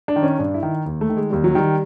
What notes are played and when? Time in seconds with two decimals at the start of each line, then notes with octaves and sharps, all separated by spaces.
0.08 D4
0.16 D#3
0.23 C#4
0.38 G2 D4
0.54 E4
0.63 D#3
0.86 D#2
1.01 A3
1.09 D#3
1.17 G#3
1.30 D#2 G3
1.44 F#3
1.55 D#3 G3